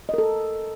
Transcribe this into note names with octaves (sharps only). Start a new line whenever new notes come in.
A4 A#4 D#5